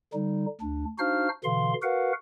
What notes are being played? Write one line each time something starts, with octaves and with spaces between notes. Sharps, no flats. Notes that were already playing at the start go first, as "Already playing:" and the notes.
D3 G3 D#4
D2 D4
D4 D#4 F#4 C5 F5 F6
B2 D3 E3 F5 C6
F#4 A#4 B4 F5 F#5